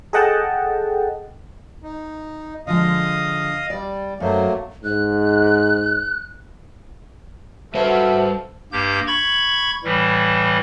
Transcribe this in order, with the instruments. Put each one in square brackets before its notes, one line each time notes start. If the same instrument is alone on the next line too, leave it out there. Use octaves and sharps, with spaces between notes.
[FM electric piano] G#4 A4 D#5 F#5 G5 A5
[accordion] D#4
[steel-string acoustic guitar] D3 F3 G#3 [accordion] D#5 F5 D#6
[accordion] G3 [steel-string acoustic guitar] D5
[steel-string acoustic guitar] F#2 C5 [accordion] F#3 A3 A#3
[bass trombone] G#2 [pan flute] F#6
[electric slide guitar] G3 B4 F5 [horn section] F#4 E5 [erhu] A4 [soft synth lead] C5
[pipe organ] G2 A#3 G4 G6
B5 C#6 G#6
A2 E3 G3